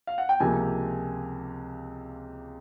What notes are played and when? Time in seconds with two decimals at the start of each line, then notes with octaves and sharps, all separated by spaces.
0.07 F5
0.18 F#5
0.29 G5
0.40 C#2 C3 F3 A#3 G#5